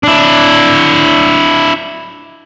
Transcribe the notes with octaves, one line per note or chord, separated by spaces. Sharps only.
D4 E4